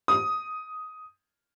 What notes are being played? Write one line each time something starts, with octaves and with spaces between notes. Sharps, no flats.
D#6